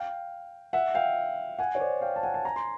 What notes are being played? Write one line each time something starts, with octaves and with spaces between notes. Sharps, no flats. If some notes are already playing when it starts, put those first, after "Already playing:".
Already playing: F5 G5
E5 F#5
F5 G5
F#5 G#5
C#5
C5 D5
F5 G5
A5
F#5 G#5
A5
G#5 A#5
C6